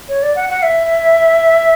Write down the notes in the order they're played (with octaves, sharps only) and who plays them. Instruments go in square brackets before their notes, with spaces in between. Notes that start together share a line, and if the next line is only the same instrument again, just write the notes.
[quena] C#5
D5
F#5
F#5
E5